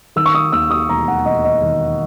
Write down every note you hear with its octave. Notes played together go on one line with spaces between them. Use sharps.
D#3 E6
C#6
D#6
D#2 E6
D#6
E1 A#5
F#5
E1 D#5
D#5
D#3